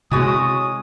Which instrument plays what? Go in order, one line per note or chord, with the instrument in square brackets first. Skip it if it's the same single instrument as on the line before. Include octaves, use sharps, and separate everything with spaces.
[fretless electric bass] C3 C4 [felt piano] G#3 A6 [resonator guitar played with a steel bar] E4 F#4 C#5 [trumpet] D#6